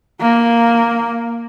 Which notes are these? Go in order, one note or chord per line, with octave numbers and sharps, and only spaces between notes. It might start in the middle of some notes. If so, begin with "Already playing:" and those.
A#3